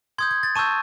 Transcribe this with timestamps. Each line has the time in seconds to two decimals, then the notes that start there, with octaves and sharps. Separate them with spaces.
0.18 C6 D#6 G6 G#6
0.31 G#6
0.43 A6
0.55 A5 C#6 E6 G6 D#7